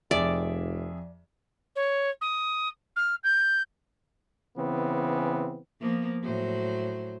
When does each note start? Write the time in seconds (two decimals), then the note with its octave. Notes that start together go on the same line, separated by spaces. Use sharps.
0.11 F1 F2 G#4 D5 E5
1.76 C#5
2.21 D#6
2.96 F6
3.24 G6
4.57 C#3 E3 B3 C4
5.81 F3 A#3 B3
6.23 A2 F#3 C5